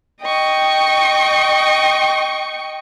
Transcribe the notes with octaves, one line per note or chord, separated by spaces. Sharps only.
D#5 G5 C#6